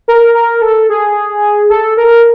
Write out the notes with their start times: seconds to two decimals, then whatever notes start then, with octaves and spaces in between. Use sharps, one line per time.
0.08 A#4
0.35 A#4
0.62 A4
0.89 G#4
1.70 A4
1.97 A#4